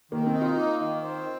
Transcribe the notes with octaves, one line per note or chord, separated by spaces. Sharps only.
D#3 A#3
C4
D#4
F4
A#3
D#3
C4